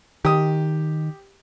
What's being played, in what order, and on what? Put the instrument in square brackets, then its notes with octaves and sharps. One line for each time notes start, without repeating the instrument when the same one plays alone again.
[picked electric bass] D#3 [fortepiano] G4 D#6